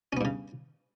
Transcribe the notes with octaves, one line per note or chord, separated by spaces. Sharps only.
G2 C#3 B3 C#4